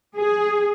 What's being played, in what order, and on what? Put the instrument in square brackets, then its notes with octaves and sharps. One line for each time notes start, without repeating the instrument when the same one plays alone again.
[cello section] G#4